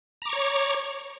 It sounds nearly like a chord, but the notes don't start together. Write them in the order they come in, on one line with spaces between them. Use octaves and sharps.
A#5 D6 C#6 C#5